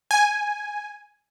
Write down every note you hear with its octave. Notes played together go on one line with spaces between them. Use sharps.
G#5